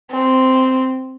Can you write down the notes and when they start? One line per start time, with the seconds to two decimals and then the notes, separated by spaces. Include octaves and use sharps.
0.11 C4